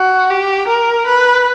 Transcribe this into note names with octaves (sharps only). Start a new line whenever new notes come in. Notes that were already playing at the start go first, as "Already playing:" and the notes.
Already playing: F#4
G4
A#4
B4